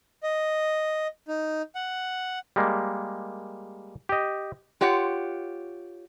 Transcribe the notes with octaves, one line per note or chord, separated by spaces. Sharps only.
D#5
D#4
F#5
G3 G#3 A#3
G4 D#5
F4 G4 C#5 F#5